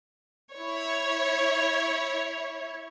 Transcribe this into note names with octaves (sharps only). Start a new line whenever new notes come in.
E4 C#5